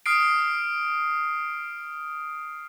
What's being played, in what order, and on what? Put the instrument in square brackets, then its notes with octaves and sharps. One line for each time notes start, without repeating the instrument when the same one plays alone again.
[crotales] D#6 F6 C7 D7